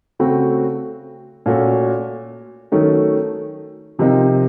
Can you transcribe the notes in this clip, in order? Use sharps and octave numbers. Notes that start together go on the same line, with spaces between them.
C#3 A3 C4 F#4
A#2 A3 C#4 F#4 A4
D#3 F#3 A3 C#4 A4
C3 F3 C4 D#4 A#4